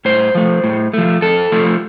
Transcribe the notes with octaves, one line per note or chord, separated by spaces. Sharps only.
A2 C5
F3 A3
A2
F3 A3
F2 A4
F3 A3